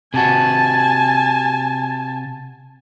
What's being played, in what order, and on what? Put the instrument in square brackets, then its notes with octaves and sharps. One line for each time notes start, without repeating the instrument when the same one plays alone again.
[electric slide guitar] C3 F#4 [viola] G#5 A5